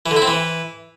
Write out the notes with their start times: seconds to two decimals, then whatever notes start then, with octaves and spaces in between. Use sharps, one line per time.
0.06 E3
0.11 D3
0.16 E4
0.22 C4
0.27 E3